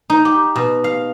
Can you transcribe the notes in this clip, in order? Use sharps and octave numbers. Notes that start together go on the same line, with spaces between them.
D#4
G4
B2
F5